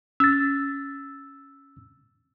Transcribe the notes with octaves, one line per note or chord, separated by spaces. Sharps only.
C#4 E6 A6